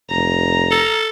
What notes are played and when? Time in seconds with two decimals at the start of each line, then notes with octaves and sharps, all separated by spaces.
0.10 F1 A#5
0.71 A4